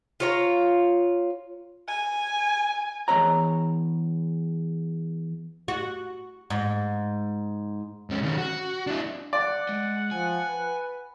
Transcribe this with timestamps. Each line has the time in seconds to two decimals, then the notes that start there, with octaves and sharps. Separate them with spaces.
0.20 F4 C#5 A#5
1.88 G#5
3.08 E2 C#5 A#5
5.68 F#4
6.50 G#2
8.10 G#2 C#4
8.23 D#3 C#4
8.38 F#4
8.87 D4 E4
9.33 D5 F#5
9.69 G#3
10.11 F3 G#5
10.48 B4